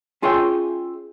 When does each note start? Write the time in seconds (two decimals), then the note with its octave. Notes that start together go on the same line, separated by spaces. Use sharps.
0.22 C#4 F4 G#4 C#5 E5 G5